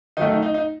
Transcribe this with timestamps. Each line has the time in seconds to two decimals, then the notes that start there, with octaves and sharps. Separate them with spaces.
0.17 D#3 F#3 A3 D#4
0.30 D#4
0.42 D#4
0.54 D#4